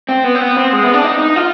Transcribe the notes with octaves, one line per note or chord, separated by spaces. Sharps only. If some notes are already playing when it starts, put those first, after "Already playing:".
C4
B3
C4
B3
C4
G#3
B3
D4
D#4
D#4
F4